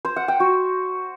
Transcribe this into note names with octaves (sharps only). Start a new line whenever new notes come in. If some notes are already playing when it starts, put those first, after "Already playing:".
C5
F#5
G5
F#4